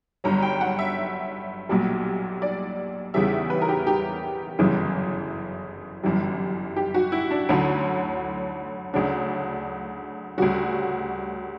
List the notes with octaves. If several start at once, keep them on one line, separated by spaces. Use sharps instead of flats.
G1 G2 F#3 A#5
G5
F#5
E5
B1 A#2 G3
D5
E2 C#3 E3 G3 E5
B4
A#4
G4
G4
G1 F#2 C#3 E3
G1 F#2 E3 G3
G4
F#4
E4
D4
D2 D3 F#3 C#4
D2 C#3 F#3 D4
D2 C#3 G3 F#4